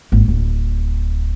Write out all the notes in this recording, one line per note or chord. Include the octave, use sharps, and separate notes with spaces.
G#1
D1